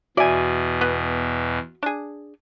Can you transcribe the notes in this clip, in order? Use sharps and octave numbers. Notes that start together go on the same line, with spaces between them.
E2 B2 F#4 D5 E5 G#5
B3
D4 G#4